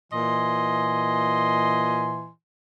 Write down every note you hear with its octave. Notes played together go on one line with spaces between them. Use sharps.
A#2 E3 D#5 G#5 C6